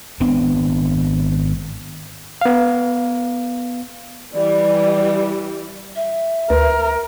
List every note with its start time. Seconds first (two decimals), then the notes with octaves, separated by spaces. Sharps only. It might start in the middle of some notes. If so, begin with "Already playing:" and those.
0.20 G#1 B3 C4 D4
2.41 B3 F5
4.34 E3 G3 D5
5.96 E5
6.50 D2 A#4 B4